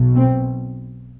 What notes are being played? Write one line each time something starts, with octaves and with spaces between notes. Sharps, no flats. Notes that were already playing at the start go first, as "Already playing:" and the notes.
Already playing: B1 B2
C4